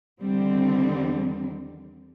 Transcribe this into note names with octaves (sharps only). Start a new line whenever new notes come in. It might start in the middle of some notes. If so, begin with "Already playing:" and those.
E2 D3 D#3 G3 C4